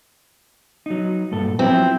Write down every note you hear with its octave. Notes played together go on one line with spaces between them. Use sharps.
F#3 D#4
G2 A#2 A4
F3 F#3 C4 E4